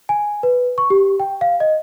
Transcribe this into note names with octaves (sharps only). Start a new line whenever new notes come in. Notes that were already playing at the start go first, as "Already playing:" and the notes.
G#5
B4
C#6
G4
G5
F5
D#5